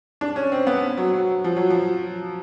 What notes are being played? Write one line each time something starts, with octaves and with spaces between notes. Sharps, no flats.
D4
C#4
C4
B3
F#3
F#3
F3
F#3
F3